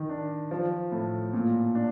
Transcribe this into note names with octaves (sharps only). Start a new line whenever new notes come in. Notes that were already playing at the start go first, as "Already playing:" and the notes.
Already playing: D#3
D4
F3
A2
A#2
D4